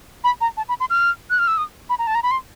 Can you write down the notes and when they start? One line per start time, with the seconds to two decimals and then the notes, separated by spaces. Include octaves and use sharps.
0.24 B5
0.41 A#5
0.57 A5
0.69 B5
0.80 C6
0.90 F6
1.30 F#6
1.39 F6
1.48 E6
1.57 D#6
1.90 B5
1.99 A#5
2.07 A5
2.15 A#5
2.23 B5
2.31 C6